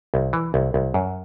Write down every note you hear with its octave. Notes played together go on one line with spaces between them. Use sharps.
C2
E3
C2
C2
F#2